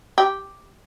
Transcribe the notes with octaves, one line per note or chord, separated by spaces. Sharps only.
G4